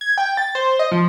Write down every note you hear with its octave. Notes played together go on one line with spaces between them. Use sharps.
G#6
G5
A6
C5
D#5
F3